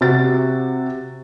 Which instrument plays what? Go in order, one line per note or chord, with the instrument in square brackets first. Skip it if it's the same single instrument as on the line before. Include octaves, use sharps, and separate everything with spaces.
[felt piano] C3 F#4 A6